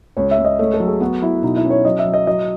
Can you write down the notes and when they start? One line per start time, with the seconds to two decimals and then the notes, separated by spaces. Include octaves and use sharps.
0.17 C#2 C#5
0.31 E5
0.38 C#2
0.45 D#5
0.59 A3 C#5
0.74 A4
0.80 F#3
0.87 G#4
1.00 B3 F#4
1.22 F#3 E4
1.43 B2 D#4
1.56 E4
1.65 C#4
1.70 C#5
1.85 F#3 D#5
1.99 E5
2.05 F#3
2.14 D#5
2.27 F#3 D#5